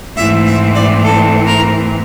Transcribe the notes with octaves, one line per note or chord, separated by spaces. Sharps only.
G#2 E3 A3 C4 E5
E5
D5
A4
A#4